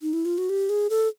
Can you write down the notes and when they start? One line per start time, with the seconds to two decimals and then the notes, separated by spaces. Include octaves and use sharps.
0.01 D#4
0.13 E4
0.25 F4
0.38 F#4
0.49 G4
0.69 G#4
0.90 A4